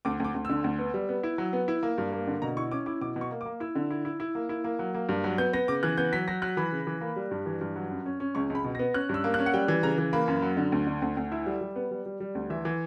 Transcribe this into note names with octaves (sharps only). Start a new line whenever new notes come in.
D2 D6
D2 D6
D2
D3 E6
D2
B3
G3
B3
E4
F#3
B3
E4
A#3
G2
A#3
D3
B2 A#5
E4 C#6
C#4 D6
E4 D6
B2 D6
B2
C#6
A#3
D6
A#3
E4 E6
D3
E4
E4
E4
A#3
E4
A#3
F#3
A#3
G2
F#3
B3 G6
B3 A#6
C#3 D6
E3 F#6
B3 G6
F#3 B6
F#3 A#6
F#3 F#6
E3 B5
C#3
E3
A#3
G3
G2
E3
G2
F#3
F#2
C#4
C#4
C#2 C#6
C#2 B5
B2
A#6
B3
C#4 F#6
G2 E6
A#3
F#6
C#4
F#5
G3 G5
E3
C#3 A#5
E3
A#3 B5
F#2
F#3
D3
D2
D3
D2
D2
E4 E5
G3
G3
B3
G3
G3
G3
D2
E3 E5
E3